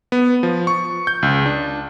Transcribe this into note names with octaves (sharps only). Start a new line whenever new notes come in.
B3
F3
C#6
G6
C#2
D4